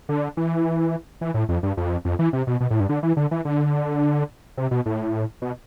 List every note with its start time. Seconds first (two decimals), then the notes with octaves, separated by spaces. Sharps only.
0.09 D3
0.37 E3
1.21 E3
1.34 A2
1.49 F2
1.63 G2
1.77 F2
2.05 F2
2.19 E3
2.33 C3
2.47 B2
2.60 B2
2.70 A2
2.80 G2
2.89 D3
3.03 E3
3.17 D3
3.31 E3
3.45 D3
4.57 C3
4.71 B2
4.86 A2
5.42 B2